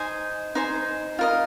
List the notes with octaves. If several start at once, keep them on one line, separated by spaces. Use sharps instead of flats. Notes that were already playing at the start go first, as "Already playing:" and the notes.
Already playing: D#4 C5 G#5
D#4 C5 G#5
F4 A#4 D#5